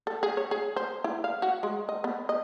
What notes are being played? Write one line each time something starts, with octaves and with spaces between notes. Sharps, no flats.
A4
G#4
C#5
G#4
C5
E4
F5
F#4
G#3
D#5
B3
D#5